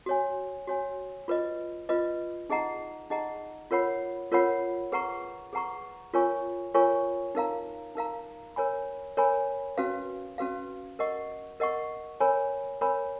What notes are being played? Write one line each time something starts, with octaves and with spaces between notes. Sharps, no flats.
F#4 C#5 G#5
F#4 C#5 G#5
F4 B4 D#5
F4 B4 D#5
D#4 G#4 D#5 F#5 A#5
D#4 G#4 D#5 F#5 A#5
F4 A#4 C#5 F#5 B5
F4 A#4 C#5 F#5 B5
G#4 B4 F#5 A#5 C#6
G#4 B4 F#5 A#5 C#6
F4 A#4 C#5 G#5 C#6
F4 A#4 C#5 G#5 C#6
D#4 A#4 F5 A#5
D#4 A#4 F5 A#5
A#4 C#5 G#5 B5
A#4 C#5 G#5 B5
C#4 F#4 B4 F5
C#4 F#4 B4 F5
A#4 D#5 F#5 C#6
A#4 D#5 F#5 C#6
A#4 C#5 G#5 B5
A#4 C#5 G#5 B5